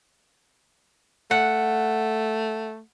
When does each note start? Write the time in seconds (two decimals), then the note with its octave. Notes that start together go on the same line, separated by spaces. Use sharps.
1.31 A3 F#5